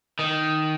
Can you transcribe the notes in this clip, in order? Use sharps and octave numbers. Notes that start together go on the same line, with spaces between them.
D#3